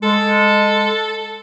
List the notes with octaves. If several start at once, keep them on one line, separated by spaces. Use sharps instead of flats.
G#3 A4